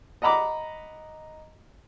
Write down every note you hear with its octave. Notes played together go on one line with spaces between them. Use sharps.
D#5 F#5 A#5 B5 D6